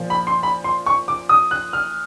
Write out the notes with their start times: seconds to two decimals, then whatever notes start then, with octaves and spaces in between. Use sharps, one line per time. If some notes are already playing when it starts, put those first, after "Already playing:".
Already playing: A#2 F3
0.10 B5
0.27 C6
0.43 B5
0.64 C6
0.86 C#6
1.08 D6
1.29 D#6
1.51 F#6
1.73 F6